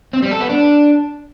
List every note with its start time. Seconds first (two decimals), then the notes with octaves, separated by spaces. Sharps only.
0.13 C4
0.22 G3
0.31 A4
0.40 B3
0.50 D4